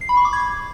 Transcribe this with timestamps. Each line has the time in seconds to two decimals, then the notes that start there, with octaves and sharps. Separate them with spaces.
0.01 C7
0.09 B5
0.17 C#6
0.25 D6
0.33 G#6